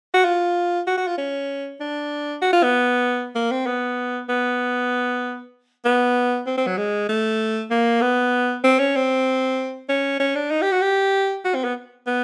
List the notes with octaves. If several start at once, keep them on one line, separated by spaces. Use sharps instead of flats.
F#4
F4
F#4
F#4
F4
C#4
D4
F#4
F4
B3
A#3
C4
B3
B3
B3
C4
C4
F#3
G#3
A3
A#3
B3
C4
C#4
C4
C#4
C#4
D4
D#4
G4
F#4
G4
F#4
C4
B3
B3